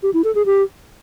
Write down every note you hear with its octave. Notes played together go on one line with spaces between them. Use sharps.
G4
E4
A4
G#4
G4